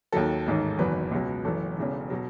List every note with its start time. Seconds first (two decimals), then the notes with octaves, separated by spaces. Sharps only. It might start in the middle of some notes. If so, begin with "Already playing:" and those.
0.12 D#2 D#3 F#3 A4
0.46 A1 G#2 D#3
0.78 F#1 E2 D#3 F#3 B4
1.11 C#2 B2 F#3
1.45 F#1 F#2 E3 A4
1.78 E1 E2 C#3 E3
2.10 B2 F#3